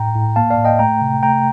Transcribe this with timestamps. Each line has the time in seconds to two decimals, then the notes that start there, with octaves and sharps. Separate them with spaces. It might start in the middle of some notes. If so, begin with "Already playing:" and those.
Already playing: A2 G5 A#5
0.15 A2
0.36 A#3 F5 A5
0.50 D5 F5
0.58 A2
0.65 D#5 G5
0.79 A3 G5 A#5
1.02 C3
1.23 A3 G5 A#5